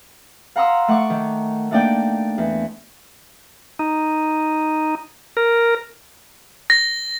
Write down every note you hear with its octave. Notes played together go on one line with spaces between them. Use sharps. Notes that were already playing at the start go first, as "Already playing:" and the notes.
F5 F#5 A#5 C6 D#6 E6
A3 F#5 C#6 D6
D#3
A3 A#3 D4 D#4 D5 G5
E2
D#4
A#4
A#6